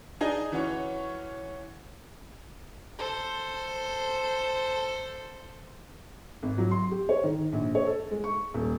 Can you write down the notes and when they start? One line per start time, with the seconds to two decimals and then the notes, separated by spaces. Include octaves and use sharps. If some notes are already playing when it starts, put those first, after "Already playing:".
0.21 D4 D#4 G#4 D#5 G#5
0.52 E3 C#4 F#4 C#5
2.98 A4 C5
6.43 G#1
6.58 F#3
6.71 C6
6.91 G4
7.09 C#5
7.23 D#3
7.52 A#1
7.75 C#5
7.86 A4
8.11 G#3
8.24 C#6
8.54 D#1